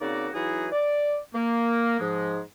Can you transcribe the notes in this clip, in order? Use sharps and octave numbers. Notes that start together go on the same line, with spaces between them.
C#3 A#3 C4 D#4 F#4 D5
E3 F#3 D#4 E4 F#4 G#4
D5
A#3
G#2 F3 G#3